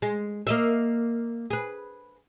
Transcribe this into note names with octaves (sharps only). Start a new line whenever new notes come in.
G#3
A#3 D#5 E5
G#4 B4